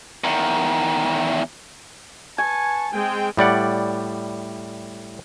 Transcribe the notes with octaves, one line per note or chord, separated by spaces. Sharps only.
E2 D#3
B4 G#5 A5 C#6
G#3 C4 G5
A2 G3 D5 F#5